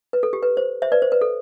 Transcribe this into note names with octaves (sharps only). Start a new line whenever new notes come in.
B4
A4
G4
B4
C5
C5 E5
B4 D5
C5
B4
A4